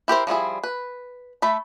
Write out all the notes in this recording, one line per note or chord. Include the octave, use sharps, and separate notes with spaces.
E4 G4 A#4 C5
F3 G3 E4 G#4
B4
A3 A4 B5